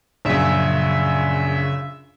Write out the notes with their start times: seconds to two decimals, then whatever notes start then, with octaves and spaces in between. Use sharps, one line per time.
0.25 A#1 F#2 C#3 E5